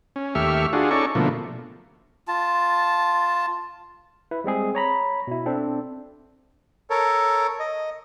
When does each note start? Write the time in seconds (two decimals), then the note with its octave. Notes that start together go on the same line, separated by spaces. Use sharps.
0.16 C#4
0.35 D#2 A3 G4 E5 C#6 F6
0.73 D4 F4 F#4 G#4
0.91 C#4 D#4 A4 D5 C#6
1.15 B2 D3 F3 A3 A#3
2.28 F4 A5
4.31 E4 B4
4.44 G3 G#3 C4 G#4
4.75 C#5 A#5 B5
5.27 B2 E4
5.46 C4 D4 A4 C5
6.90 A4 A#4 C#5
7.59 D#5